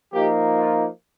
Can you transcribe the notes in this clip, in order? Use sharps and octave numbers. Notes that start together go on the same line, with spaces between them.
F3 A#3 D#4 G4
F4